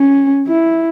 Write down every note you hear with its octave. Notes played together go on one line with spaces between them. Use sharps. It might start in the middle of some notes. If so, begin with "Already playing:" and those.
Already playing: C#4
E4